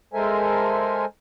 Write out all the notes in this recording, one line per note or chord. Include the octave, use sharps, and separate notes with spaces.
G#3 A4 A#4 C5 E5 G#5